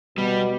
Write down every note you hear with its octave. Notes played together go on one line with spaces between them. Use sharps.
B2 G3